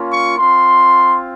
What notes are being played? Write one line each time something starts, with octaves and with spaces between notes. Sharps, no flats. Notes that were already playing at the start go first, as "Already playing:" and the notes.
Already playing: A#3 C#4 F4
C#6
C4 F4 C6